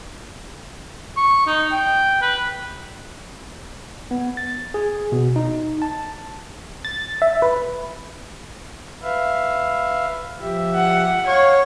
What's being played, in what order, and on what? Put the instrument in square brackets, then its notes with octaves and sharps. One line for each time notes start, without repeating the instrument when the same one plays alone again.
[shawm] C#6
D#4
G5
B4
[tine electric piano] B3
A6
G#4
B2
D#4
A5
[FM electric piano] A6
E5
B4
[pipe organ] B4 E5 F5
F3 G4 E5
[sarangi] F#5
[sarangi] C#5 [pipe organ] F5